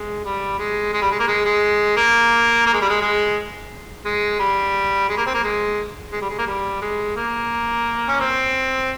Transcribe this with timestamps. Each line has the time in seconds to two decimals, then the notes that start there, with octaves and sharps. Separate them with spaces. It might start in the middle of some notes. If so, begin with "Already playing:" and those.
Already playing: G#3
0.25 G3
0.59 G#3
0.93 G#3
1.02 G3
1.11 G#3
1.20 A#3
1.28 G#3
1.45 G#3
1.97 A#3
2.66 A#3
2.73 G#3
2.82 G3
2.89 G#3
3.01 G#3
4.05 G#3
4.40 G3
5.09 G#3
5.17 A#3
5.26 C4
5.34 A#3
5.44 G#3
6.12 G#3
6.21 G3
6.30 G#3
6.39 A#3
6.47 G3
6.82 G#3
7.16 A#3
8.08 C#4
8.20 C4